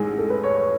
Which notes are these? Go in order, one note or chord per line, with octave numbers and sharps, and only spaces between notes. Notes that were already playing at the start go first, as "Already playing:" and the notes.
Already playing: A1 A2 G#3 D#4 G#4
A4
B4
C#5
C#5